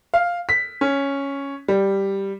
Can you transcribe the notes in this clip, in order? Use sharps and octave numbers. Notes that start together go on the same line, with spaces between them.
F5
B6
C#4
G3